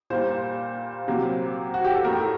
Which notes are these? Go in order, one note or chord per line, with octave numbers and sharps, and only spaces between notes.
A#2 G3 A#3 C5
C3 F#3 A#3
F#4
G4
A4
A2 A3 A#4